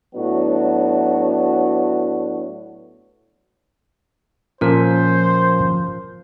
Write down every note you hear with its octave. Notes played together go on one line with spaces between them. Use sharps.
A2 F#3 B3 D4 F#4
A#2 F3 C#4 A4 A#4 C5